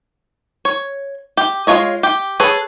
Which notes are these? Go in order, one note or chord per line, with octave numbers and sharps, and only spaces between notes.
C#5
G4
G#3 D4 F4 C#5 D#5
G4
G#4 A4 B4 C#5